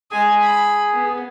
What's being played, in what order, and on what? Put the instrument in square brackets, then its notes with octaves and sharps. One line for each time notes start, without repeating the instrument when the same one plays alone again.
[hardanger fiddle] G#3 G#5 [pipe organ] G#4
[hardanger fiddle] B5
B3